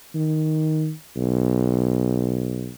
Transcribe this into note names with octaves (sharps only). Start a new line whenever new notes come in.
D#3
B1